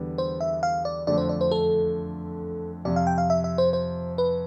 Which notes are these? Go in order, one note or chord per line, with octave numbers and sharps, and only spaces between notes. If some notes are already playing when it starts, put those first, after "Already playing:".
Already playing: E2 D3 G3 B3
C5
E5
F5
D5
F2 D3 A3 D4 D5
C5
D5
C5
A4
F2 C3 F3 D5
F5
G5
F5
E5
E5
C5
C5
B4